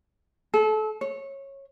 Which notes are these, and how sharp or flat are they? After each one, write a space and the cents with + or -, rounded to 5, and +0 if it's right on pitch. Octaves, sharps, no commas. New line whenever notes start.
A4 -30
C#5 -15